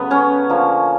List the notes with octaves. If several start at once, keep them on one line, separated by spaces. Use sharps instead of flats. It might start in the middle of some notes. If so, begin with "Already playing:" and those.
Already playing: C#3 F#3 A3 B3 B4
C#4 C#5
D3 F3 A#3